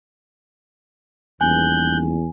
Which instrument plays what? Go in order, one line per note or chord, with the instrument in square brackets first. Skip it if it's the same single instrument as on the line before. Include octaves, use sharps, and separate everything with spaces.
[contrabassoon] D#1 [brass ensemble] E2 [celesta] G#5 [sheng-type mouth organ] F#6 G6